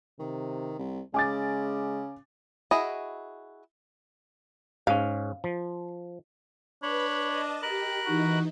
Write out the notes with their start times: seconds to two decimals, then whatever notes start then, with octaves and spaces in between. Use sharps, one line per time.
0.19 C3 D#3
0.79 C2
1.14 C#3 G#3 G#5 D6 A6
2.71 E4 F#4 G#4 D#5
4.87 G#2 C#4 F5
5.44 F3
6.83 D4 B4 C#5 B5
7.25 D#5 A5
7.62 G4 A#4 B5 F#6
8.06 E3 D#4 F#4